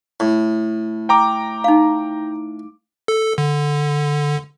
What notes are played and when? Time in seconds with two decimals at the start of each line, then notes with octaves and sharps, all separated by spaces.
0.20 A2
1.09 G5 A#5 D6
1.64 D#4 F5
3.08 A4
3.38 D3